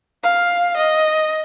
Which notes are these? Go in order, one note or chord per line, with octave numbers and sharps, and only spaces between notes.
F5
D#5